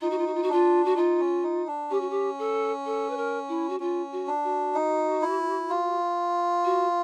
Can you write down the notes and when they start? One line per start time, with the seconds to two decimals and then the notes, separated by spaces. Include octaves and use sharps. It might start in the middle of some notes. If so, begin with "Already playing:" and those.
0.01 D#4 F4
0.10 F#4
0.18 F4
0.26 F#4
0.34 F4
0.42 F#4
0.49 D4 F4
0.85 F#4
0.96 D#4 F4
1.20 C#4
1.43 D#4
1.67 D4
1.90 C#4 G4
2.00 F#4
2.10 G4
2.38 A4
2.85 A4
3.10 B4
3.17 A#4
3.48 E4
3.69 F#4
3.80 C#4 F4
4.12 F#4
4.27 D4
4.43 F#4
4.75 D#4
5.22 E4
5.69 F4
6.64 F#4